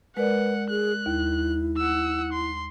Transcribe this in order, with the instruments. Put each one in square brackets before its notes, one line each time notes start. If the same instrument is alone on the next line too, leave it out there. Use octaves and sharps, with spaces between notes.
[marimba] G#3 A#4 D5 [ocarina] B4 [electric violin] F#5
[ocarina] G#4 [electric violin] F#6
[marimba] D#2 [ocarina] E4
[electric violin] F#5 E6
C6